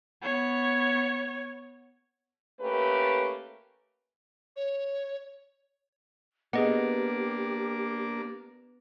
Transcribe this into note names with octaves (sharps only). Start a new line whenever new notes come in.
B3 C#5
A3 A#3 C#4 G4 B4
C#5
A#3 B3 D4 G4 G#4 D#5 F#5